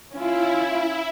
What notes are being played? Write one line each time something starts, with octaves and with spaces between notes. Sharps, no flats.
C#4 E4 F4